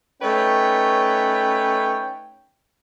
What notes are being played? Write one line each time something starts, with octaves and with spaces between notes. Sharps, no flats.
A3 C#4 D#4 B4 C#5 G5